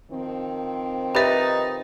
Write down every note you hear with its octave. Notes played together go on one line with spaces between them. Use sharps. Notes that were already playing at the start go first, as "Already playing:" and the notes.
D#3 F3 C4
D#4 G4 B4 E5 A6